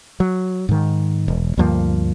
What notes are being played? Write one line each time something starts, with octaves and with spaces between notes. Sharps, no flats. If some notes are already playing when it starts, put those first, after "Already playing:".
F#3
G#2 D#3
E1
D2 G2 F3 A#3